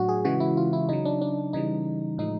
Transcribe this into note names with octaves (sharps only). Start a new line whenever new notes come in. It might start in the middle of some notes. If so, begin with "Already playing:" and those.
Already playing: A2 F#3 D4 F#4
G#4
C#3 E3 G#3 F#4
E4
F4
E4
C#3 F#3 D#4
D4
D4
C#3 E3 G3 D#4
A2 F3 G#3 D#4